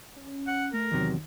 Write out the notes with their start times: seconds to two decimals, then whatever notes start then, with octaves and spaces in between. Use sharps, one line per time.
0.16 C#4
0.47 F#5
0.73 A3 A#4
0.92 E2 C3 D#3 F#3